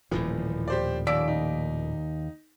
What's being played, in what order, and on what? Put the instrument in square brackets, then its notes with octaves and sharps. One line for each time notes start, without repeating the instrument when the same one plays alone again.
[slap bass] D#1 A2 F3 [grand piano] E3
[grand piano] G4 C5 D5
[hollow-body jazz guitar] D#2 D5 [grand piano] E6 B6 D7
[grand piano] D#4